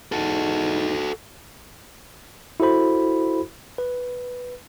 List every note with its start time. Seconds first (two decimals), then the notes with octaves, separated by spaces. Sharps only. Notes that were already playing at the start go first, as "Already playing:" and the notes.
0.12 E2 G#2 D#4 F#4 A4
2.60 E4 F#4 A4 C5 B5
3.78 B4